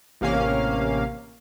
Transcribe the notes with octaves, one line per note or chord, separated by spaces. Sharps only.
A1 C3 A#3 C#4 F5